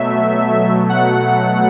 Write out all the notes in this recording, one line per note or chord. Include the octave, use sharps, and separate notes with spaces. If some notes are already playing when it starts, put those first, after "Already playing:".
Already playing: B2 F#3 A3 E5
F#5